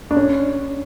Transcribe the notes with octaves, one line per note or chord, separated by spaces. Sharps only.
D4
C#4